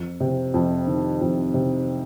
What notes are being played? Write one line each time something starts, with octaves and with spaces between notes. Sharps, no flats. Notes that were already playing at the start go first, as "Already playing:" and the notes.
Already playing: F2
C3
F2
D#3
F2
C3